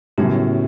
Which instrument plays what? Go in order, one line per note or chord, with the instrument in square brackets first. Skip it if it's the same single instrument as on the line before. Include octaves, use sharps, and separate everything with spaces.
[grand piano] F#2 A2 [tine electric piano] C#3 F#3 B3 E4 G4